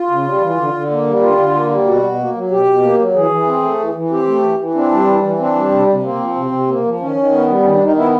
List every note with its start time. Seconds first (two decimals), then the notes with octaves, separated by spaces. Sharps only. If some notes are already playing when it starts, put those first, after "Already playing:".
Already playing: F4
0.10 C#3
0.26 G3
0.42 E3
0.58 D3
0.74 D3
0.90 A#3
1.07 G3
1.22 D3 F4
1.38 D3
1.54 A#3
1.70 G3
1.86 B2 F#4
2.03 B2
2.18 A#3
2.35 F#3
2.50 B2 G4
2.66 B2
2.82 A#3
2.99 F#3
3.14 E3 G#4
3.31 E3
3.46 C4
3.62 A3
3.79 E3
3.95 E3
4.11 C4 G4
4.27 A3
4.43 E3
4.59 E3
4.75 C4 D4
4.91 G3
5.07 E3
5.23 E3
5.39 C4 D4
5.55 G3
5.71 C3
5.87 C3
6.03 A#3 C4
6.20 F3
6.36 C3
6.51 C3
6.67 A#3
6.84 F3
7.00 D#3 C#4
7.16 D#3
7.32 B3
7.48 G3
7.63 D#3 C#4
7.75 D4
7.79 D#3
7.84 D#4
7.96 B3 E4